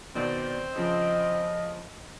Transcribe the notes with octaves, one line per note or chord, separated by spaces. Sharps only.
B2 D#3 C4 D5
C#3 F3 D#5